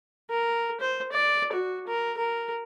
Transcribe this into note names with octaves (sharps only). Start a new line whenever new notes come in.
A#4
C5
D5
F#4
A#4
A#4